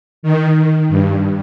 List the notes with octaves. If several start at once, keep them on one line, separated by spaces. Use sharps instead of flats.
D#3
G2